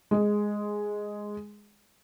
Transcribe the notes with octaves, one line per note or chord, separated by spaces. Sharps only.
G#3 G#4